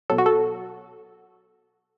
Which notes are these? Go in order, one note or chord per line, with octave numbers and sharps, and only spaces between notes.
B2 F#3 A4
F#4
A4